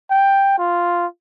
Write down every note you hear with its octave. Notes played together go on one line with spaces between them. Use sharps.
G5
F4